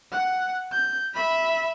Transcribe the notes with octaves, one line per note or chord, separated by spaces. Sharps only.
F#5
G6
E5 B5